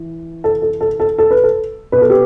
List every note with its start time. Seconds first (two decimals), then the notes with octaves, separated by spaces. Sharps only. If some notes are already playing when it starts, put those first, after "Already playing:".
Already playing: E3
0.44 A4
0.62 A4
0.81 A4
1.00 A4
1.18 A4
1.31 B4
1.43 A4
1.92 B2 B4
2.01 A4
2.10 G4 B4